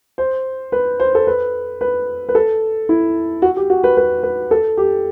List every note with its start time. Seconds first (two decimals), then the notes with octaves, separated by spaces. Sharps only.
0.18 C5
0.72 B4
1.00 C5
1.15 A4
1.27 B4
1.81 B4
2.29 B4
2.35 A4
2.89 E4
3.42 F#4
3.56 G4
3.70 F#4
3.84 B4
3.97 B4
4.23 B4
4.51 A4
4.77 G4